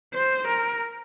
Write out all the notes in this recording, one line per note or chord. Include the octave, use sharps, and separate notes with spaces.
C5
A#4